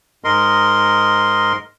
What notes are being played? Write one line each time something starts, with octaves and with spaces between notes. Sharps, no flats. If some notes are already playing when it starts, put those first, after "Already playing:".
G#2 A#4 D#5 C6